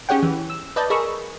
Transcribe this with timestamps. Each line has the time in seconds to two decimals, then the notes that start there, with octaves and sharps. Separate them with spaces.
0.09 C#4 G4 G#4 C#5 F#5 G5
0.23 E3
0.50 E6
0.76 B4 D5 D#5 A5 G6
0.90 G#4 A#4 D#5 B5 C#6 E6